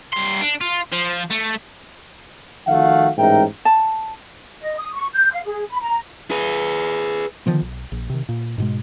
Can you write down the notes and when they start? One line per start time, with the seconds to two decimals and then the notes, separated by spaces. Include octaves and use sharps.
0.13 G2 C6
0.41 D4
0.61 F4
0.92 F3
1.30 A3
2.66 D#3 F3 A3 F#4 F5 F#5
3.17 A1 G#2 D#4 A#4 E5 G5
3.65 A5
4.61 D#5
4.78 D#6
4.92 C#6
5.13 G6
5.32 F5
5.45 G#4
5.69 B5
5.81 A#5
6.31 G#4 B4
7.46 D3 D#3 F3 B3
7.61 B1
7.92 A#1
8.10 C3 D#3
8.29 A#2
8.58 G#2 B2 G#3